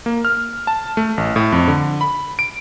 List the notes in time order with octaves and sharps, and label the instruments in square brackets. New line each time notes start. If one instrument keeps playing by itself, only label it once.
[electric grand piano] A#3
F6
A5
A3
A1
A2
F2
D3
B5
D7